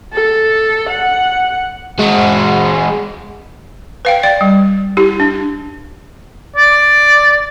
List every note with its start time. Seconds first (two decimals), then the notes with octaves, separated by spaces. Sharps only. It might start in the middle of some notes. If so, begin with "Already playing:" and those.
0.13 A4
0.89 F#5
1.99 G#3 F#4
4.05 B4 F5 G5
4.23 D5 G5
4.41 G3
4.97 E4 G4
5.20 D4
6.56 D5